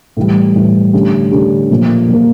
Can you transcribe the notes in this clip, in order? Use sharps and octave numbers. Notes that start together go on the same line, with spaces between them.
A2 E3 G3
A2 E3 G3
D3 A3 C#4 G4
D3 A3 C#4 G4
A#2 F3 A#3
A#2 F3 A#3